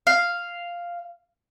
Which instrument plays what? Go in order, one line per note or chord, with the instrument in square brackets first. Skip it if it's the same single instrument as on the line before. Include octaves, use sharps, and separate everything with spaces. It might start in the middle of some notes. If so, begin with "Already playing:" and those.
[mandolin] F5